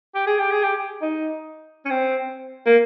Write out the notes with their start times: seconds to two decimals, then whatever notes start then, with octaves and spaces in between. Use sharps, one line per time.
0.15 G4
0.27 G#4
0.39 G4
0.51 G#4
0.63 G4
1.02 D#4
1.85 C#4
1.90 C4
2.66 A#3